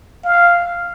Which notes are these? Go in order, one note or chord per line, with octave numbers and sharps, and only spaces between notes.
F5